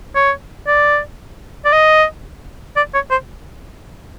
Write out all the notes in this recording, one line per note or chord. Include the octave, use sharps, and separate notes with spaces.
C#5
D5
D5
D#5
D5
C#5
C5